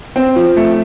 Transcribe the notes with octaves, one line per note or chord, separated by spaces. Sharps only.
C4
F3
A3